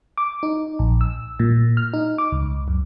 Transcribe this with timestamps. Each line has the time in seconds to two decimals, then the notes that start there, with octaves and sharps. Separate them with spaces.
0.18 D6
0.43 D#4
0.79 A#1
1.01 E6
1.40 A#2
1.77 F6
1.94 D#4
2.18 D6
2.32 C#2
2.68 F#2